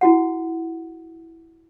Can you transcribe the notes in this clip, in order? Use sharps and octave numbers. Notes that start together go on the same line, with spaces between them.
E4 F#4 F#5